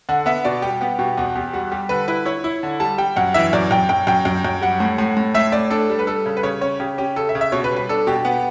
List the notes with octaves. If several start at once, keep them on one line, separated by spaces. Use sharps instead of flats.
D3 F#5
B3 E5
B2 D5
G3 G4
B3 G4
B2 G4
E2 F#4
E2 G4
G3 F#4
G3 G4
D3 B4
E4 B4
E4 C#5
E4
D3
G3 A5
G3 G5
F#2 F#5
E3 E5
F#2 D5
F#2 G5
F#2 G5
F#2 G5
F#2
F#2
G3 F#5
A2
A2
A2
A2 E5
A2 D5
D4 A4
G3
B4
G3 A4
C#3
B4
C#3 C#5
C#4 C#5
C#3 G4
C#4 G4
C#3 A4
E5
C#3
E5
B2 C#5
B4
G3
B4
D4 A4
B2 G4
B3